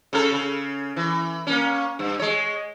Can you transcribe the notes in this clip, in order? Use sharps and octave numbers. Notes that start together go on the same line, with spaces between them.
C#3 C#4 A4
C#3
E3
A#3 C#4
G2
G#3 C#5